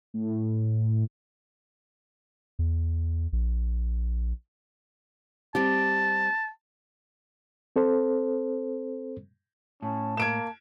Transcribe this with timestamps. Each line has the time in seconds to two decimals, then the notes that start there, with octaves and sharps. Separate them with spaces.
0.14 A2
2.59 E2
3.33 A#1
5.55 G3 C4 G4 A5
7.76 C4 A4 C5
9.83 A2 C#4 A5
10.17 A#3 G#6 D7 E7